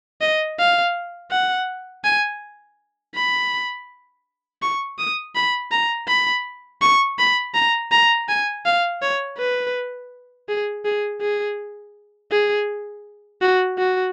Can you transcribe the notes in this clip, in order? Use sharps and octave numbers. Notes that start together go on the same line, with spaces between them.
D#5
F5
F#5
G#5
B5
C#6
D#6
B5
A#5
B5
C#6
B5
A#5
A#5
G#5
F5
C#5
B4
G#4
G#4
G#4
G#4
F#4
F#4